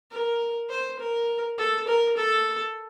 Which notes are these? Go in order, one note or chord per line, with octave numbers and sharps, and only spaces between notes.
A#4
C5
A#4
A4
A#4
A4